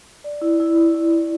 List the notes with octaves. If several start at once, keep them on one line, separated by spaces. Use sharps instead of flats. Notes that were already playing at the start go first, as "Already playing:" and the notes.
D5
E4
E4
E4
E4
E4